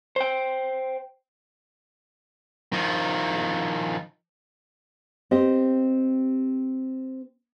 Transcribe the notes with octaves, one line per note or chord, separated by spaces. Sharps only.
C5 G5
D#3 F3
C4 G4 D#5